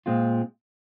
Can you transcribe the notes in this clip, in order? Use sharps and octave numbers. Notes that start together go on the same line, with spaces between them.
A#2 G#3 C4 F4